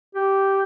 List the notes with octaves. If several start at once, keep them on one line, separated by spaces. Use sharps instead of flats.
G4